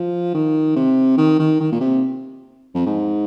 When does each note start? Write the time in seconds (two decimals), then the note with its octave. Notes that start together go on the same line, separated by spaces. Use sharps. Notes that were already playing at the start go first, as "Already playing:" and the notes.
Already playing: F3
0.34 D#3
0.76 C3
1.18 D#3
1.39 D#3
1.60 D#3
1.72 A#2
1.81 C3
2.75 F2
2.86 G#2